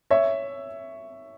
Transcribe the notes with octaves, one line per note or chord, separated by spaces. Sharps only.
C#5 E5